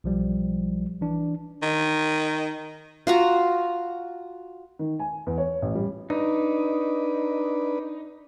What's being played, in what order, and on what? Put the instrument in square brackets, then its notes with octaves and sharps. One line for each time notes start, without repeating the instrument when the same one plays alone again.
[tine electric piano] B1 F3 G3
E3 D4
[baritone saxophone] D#3
[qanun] F4 F#4 A#5
[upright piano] D#3
G#5
E2
C#5
A1
G3
[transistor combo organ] D4 B4 [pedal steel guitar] D#4